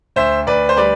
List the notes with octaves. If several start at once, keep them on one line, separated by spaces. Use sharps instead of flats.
D2 C5 E5
D2 B4 D5
C5
G3 B4 D5